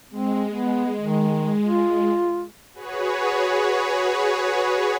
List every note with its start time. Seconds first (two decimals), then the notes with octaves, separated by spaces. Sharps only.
0.11 G#3 C4
0.49 B3
1.00 D#3
1.65 F4
2.73 F#4 G#4 B4 C#5